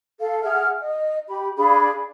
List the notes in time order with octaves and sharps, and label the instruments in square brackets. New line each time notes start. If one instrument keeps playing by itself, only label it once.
[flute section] A4 F5
G#4 E5 F#5 F6
D#5
G4 B5
D4 G#4 F5 B5